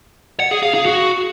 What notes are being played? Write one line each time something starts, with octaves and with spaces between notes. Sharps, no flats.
F#5
G#4
F5
G#4
F#4